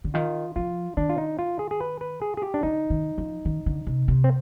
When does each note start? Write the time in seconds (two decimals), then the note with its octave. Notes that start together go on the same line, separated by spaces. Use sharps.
0.04 D3
0.14 D#3 F4
0.56 F3 F4
0.97 D#3 D4
1.09 F4
1.18 D#4
1.39 F4
1.59 G#4
1.71 G#4
1.80 B4
2.01 B4
2.22 G#4
2.37 G#4
2.42 G4
2.54 D4
2.63 D3 D#4
2.90 D#3
3.18 F3
3.45 D#3
3.66 D3
3.87 C3
4.08 C3
4.24 C4